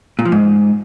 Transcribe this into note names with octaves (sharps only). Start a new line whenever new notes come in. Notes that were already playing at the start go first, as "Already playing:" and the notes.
A#2
F3
G#2